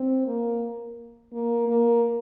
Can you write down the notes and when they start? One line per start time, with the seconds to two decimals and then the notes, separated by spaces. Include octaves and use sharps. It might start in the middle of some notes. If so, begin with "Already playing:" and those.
Already playing: C4
0.26 A#3
1.33 A#3
1.68 A#3